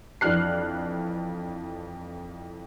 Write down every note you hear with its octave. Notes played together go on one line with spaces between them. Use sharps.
F2 E3 D4 F6 F#6 C7